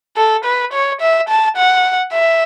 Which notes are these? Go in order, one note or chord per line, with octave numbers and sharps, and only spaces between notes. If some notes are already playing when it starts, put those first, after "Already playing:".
A4
B4
C#5
E5
A5
F#5
E5